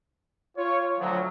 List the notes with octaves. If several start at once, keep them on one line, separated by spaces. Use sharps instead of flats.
F4 C#5
D2 F3 F#3